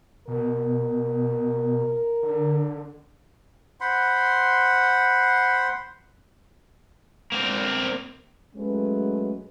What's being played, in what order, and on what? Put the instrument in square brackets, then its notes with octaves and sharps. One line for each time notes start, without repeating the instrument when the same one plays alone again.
[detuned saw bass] B2 [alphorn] A#4
[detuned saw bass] D3
[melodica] C5 F#5 B5 C6
[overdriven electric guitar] A#3 C4
[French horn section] F#3 G#3 A3 C#4 B4